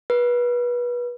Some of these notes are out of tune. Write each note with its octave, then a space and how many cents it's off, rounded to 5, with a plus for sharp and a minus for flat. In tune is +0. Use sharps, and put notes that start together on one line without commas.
B4 -30